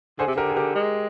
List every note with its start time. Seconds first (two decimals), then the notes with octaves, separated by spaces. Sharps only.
0.19 D3 G#4 C5
0.27 C3
0.35 D3 G4 A#4
0.50 G#4
0.56 G4 A#4
0.75 G#3